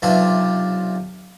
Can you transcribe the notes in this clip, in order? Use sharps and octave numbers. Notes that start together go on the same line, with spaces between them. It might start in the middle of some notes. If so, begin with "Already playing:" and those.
B1 C3 D4 F4 E5